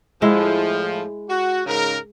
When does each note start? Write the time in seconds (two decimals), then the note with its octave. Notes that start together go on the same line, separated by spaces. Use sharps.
0.22 A2 F3 G#3 E4
1.29 F#4
1.66 G#2 C#3 A#4